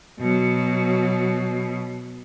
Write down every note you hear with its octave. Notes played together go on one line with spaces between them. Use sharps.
B2 F#3